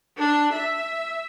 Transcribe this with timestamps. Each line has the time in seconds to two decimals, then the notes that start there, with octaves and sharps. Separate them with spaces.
0.18 D4
0.53 E5